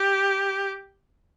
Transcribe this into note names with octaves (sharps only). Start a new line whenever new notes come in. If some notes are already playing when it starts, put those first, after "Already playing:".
Already playing: G4